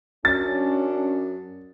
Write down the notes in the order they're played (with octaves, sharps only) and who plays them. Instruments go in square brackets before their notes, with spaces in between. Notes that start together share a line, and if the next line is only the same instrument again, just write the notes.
[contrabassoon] F#2 [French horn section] C#4 D4 [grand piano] A6